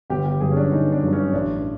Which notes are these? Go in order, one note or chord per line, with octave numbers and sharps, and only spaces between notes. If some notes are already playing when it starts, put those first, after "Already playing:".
G1 G4
G4
G2 D3 F#3 G#4
C#4
D4
G1 D#4
D4
G2 D3 F#3
C#4
A1 D4